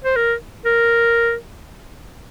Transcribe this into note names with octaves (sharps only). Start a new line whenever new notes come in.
C5
A#4
A#4